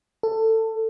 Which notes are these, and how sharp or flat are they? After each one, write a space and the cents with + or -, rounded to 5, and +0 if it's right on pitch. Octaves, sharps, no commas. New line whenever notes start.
A4 +20